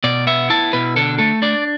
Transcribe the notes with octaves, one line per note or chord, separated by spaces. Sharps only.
B2 D5
B3 E5
E4 A5
B2 B4
D3 A4
A3 A4
D4 D5